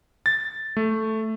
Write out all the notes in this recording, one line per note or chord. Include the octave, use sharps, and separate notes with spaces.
A6
A3